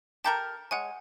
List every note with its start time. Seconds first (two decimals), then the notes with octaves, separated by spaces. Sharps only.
0.24 G4 A4 A#4 A5 G6
0.71 G#3 C#5 F#5 G#5